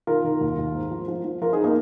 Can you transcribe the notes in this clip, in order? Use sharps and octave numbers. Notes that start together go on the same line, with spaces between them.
D#3 F4 A#4
D#3
D#2
D#2
G#2
F3
F3
F3
F3 F4 A#4
D#4 G#4
A#3 D#4